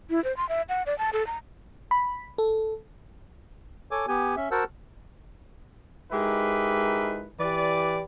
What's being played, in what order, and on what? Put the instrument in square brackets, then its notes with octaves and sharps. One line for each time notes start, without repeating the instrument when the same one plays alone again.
[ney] E4
C5
C6
E5
F#5
D5
A5
A4
A#5
[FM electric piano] B5
A4
[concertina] A4 C#5 G#5 D6
B3 G4 G#5
C#4 E5
F#4 A#4 C5 F#5 A5 E6
[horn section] G#3 D#4 E4 G4 A#4 B4
E3 G4 B4 D5